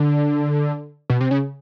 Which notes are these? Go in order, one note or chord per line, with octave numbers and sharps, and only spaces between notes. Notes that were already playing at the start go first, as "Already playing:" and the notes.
Already playing: D3
B2
C3
C#3